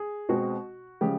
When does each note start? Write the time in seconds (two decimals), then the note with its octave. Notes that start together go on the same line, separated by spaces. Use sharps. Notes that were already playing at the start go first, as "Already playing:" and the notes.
Already playing: G#4
0.29 B2 G#3 C4 F#4
1.01 C#3 F3 G#3 G4